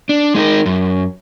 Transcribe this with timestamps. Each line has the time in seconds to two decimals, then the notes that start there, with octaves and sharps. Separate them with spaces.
0.09 D4
0.34 G#3 D#4 A4 A#4
0.66 F#2